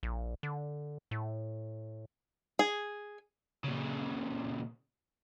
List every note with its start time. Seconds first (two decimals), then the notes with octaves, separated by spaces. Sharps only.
0.03 A#1
0.43 D3
1.11 A2
2.59 G#4
3.64 A#2 C#3